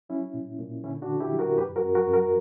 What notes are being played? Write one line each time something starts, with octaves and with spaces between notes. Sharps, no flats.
F#3 C#4 E4
A#2
A#2
D3 C#4 E4
D4 F#4
D3
E4 G4
F#3
F#4 A#4
F#2 G4 B4
F#4 A#4
F#2
F#4 A#4
F#2
F#4 A#4